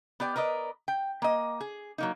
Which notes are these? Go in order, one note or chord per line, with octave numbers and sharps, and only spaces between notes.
B3 G4 D5 G5
A#4 B4 D5 D#5
G5
A#3 D#5
G#4
F#3 A#3 D#4